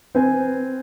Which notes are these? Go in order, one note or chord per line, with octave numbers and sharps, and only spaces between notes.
C4 B4 G#5